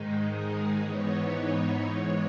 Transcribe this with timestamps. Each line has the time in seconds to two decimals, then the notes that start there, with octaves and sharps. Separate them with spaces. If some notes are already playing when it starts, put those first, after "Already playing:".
Already playing: G#2 D#3 G#3 D#4
0.24 G#4
0.78 G#2 E3 B3 D#4 C#5
1.85 G#2 E3 G#3